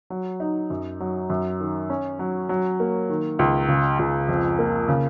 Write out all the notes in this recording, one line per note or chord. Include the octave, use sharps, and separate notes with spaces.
F#3
D#4
F#2
F#3
F#2
D#3
C#4
F#3
F#3
A#3
D#3
C#2
C#3
C#2
F2
A#3
C#3